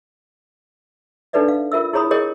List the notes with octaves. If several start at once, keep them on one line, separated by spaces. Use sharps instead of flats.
D4 D#4 A4 B4 D5 E5
F5
F4 A#4 E5 E6
E4 G#4 C#5 A#5 B5 D#6
G#4 A#4 C#5 D#5 G5